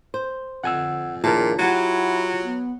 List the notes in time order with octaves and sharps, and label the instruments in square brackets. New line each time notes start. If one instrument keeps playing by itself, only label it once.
[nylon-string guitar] C5
[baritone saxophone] F2 [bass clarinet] D3 [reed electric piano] F#5 G#5 E6
[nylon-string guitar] D#2 F3 A5 [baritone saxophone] A#2 [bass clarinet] D4 [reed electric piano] E4 G#4 A#4
[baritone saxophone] F#3 [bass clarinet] E4 [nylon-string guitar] F4 G4 [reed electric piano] F#5 G#6
[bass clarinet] B3